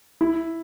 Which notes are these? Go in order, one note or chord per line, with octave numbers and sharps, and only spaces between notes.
E4